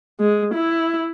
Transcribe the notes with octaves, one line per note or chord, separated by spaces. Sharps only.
G#3
E4